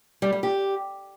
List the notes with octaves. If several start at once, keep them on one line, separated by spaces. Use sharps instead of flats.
G3
G3
G4